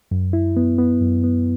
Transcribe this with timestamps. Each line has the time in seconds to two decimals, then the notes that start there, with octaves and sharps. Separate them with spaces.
0.11 F#2
0.33 E4
0.57 B3
0.78 B3
1.01 F#2
1.24 B3